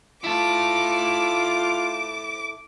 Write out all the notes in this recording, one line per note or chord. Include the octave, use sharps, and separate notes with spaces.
E4 F4 A4 D6